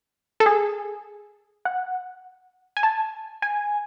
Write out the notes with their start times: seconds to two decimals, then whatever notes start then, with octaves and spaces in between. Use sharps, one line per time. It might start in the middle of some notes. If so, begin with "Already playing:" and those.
0.40 A4
0.46 G#4
1.65 F#5
2.77 G#5
2.83 A5
3.42 G#5